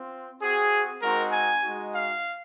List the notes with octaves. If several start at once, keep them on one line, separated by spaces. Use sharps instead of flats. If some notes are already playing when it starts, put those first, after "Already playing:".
Already playing: C4 F4
C4 F#4 G#4
G#3 C4 D#4 F#4 A#4
G#5
G#3 D#4 F#4
F5